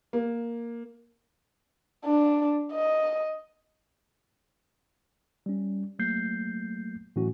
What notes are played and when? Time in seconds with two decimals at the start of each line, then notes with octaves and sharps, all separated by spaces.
0.13 A#3
2.05 D4
2.72 D#5
5.46 G3 C#4
5.99 F#3 A3 A#3 G6 C7
7.16 A2 E3 F#3 A3 C#4 F#4